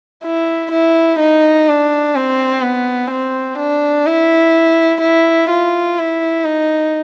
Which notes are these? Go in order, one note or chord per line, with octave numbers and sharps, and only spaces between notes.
E4
E4
D#4
D4
C4
B3
C4
D4
E4
E4
F4
E4
D#4